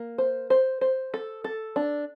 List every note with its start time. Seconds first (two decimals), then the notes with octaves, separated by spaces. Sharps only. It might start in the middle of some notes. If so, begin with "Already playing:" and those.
Already playing: A#3
0.18 C5
0.50 C5
0.81 C5
1.14 A4
1.44 A4
1.76 D4